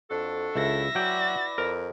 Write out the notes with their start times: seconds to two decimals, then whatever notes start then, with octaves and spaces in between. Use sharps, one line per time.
0.10 F2 D4 F#4 A4
0.55 C#2 E4 E5 A#6
0.95 F#3 E4 F#4 B4 D5 G5
1.58 F2 A#4